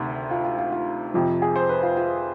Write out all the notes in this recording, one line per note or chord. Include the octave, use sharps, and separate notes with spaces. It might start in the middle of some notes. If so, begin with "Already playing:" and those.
Already playing: D2 C3 D#3
F4
F4
F4
F4
F2 C3 F3
G#4
C5
B4
F4
F4